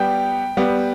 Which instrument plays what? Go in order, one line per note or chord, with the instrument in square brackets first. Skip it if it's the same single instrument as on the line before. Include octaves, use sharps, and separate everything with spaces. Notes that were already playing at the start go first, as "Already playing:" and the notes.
Already playing: [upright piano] G3 B3 G4 [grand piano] G5
[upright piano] G3 B3 G4